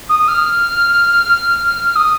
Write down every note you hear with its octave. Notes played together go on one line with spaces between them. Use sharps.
D#6
F6
D#6